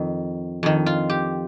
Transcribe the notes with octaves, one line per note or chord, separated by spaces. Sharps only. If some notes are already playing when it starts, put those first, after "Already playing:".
Already playing: F2 D#3
F2 D#3
F4
G4